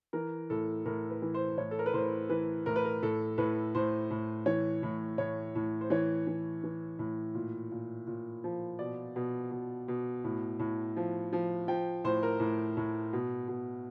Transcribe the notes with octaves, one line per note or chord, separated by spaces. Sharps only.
E3 A#4
A2 A4
A2 A#4
B4
E3
C5
A2 C#5
A4
A#4
B4
A2 C5
E3 B4
A2 A#4
B4
A#4
A2 A4
A2 B4
A2 C5
A2
E3 C#5
A2
A2 C#5
A2
C5
E3 C#5
E3
E3
A2
A#2
A#2
A#2
F3
B2 D5
B2
B2
B2
A2
A2
F3
F3
F3 G5
A2 C5
A#4
A2
A2
B2
B2